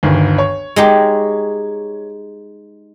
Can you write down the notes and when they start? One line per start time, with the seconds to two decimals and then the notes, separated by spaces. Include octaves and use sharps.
0.03 G1 D2 D#3
0.38 C#5
0.76 G#3 D#4 G4